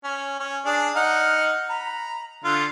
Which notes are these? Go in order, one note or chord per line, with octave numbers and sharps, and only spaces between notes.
C#4
C#4
D4 G#4
D#4 F#5 F6
A#5 B5
D3 F4